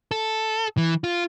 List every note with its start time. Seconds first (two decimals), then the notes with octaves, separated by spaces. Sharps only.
0.11 A4
0.77 E3
1.04 F4